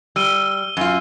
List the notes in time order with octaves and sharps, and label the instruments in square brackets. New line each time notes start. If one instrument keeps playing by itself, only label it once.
[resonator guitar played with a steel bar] G3 [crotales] E6 D#7 G7
[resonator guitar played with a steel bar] F#2 F4